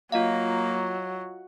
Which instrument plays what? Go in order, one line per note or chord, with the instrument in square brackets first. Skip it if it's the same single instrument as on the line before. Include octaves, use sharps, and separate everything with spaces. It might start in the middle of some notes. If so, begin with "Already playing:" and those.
[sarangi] F#3 [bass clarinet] A#3 [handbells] F4 D#5 F5